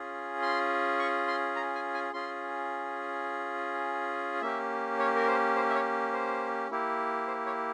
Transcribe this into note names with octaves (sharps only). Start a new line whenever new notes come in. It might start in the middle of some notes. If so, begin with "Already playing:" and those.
Already playing: C#4 F4 G#4
C6
C#6
C6
A#5
G#5
G#5
C#4 F4 G#4 C6
A#3 C#4 G4 E5
C#5
A#4
C5
C5
E5
C#5
C5
A#3 E4 G4
C5
C#5